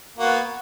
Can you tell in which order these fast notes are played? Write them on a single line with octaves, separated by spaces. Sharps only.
A#3 F#4 B3